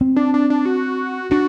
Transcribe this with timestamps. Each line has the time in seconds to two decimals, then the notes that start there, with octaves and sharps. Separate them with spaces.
0.01 C4
0.16 D4
0.34 D4
0.50 D4
0.65 F#4
1.31 D4 F#4